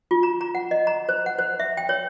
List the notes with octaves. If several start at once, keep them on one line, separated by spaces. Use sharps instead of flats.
F4
A#5
A#5
F#5
D#5
A#5
C5
F#5
C5
E5
G5
C#5